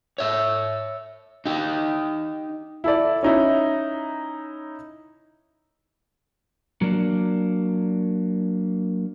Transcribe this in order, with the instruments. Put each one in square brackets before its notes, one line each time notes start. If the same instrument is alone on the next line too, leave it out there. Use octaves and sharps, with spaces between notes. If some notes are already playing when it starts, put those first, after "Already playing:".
[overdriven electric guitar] C#5 E5
D#4 G4
[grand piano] E4 A4 D5
C#4 D#4 E4
[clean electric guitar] F#3 A#3 D4